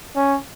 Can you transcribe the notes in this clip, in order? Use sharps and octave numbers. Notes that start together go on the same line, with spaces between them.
C#4